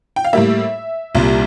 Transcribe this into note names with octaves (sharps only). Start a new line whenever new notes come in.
G5
F5
A2 G3 A#3 E5
C2 A#2 G3